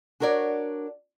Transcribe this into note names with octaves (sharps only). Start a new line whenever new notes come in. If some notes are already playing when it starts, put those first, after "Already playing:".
D4 F#4 A#4 C#5 D5